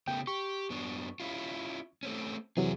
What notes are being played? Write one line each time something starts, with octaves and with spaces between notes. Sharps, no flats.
C#3 A3 B3 G5
G4 C#6
F#2 B3 D4
C#4 E4 F4
A3 C4 C#4
F2 C3 E3 F#3 G#4